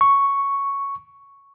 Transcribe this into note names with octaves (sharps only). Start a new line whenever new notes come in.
C#6